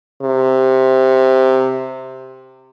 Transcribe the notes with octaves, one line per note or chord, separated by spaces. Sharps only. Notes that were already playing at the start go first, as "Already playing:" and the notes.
C3